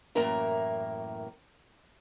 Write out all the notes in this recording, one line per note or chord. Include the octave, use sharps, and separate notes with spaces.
F#2 A2 E3 A#3 A#4 E5